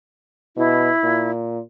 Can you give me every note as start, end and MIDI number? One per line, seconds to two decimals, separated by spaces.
0.57 0.89 47
0.57 1.31 64
1.03 1.60 46